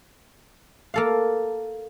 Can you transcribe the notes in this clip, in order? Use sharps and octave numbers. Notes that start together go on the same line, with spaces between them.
A#3 A4 F5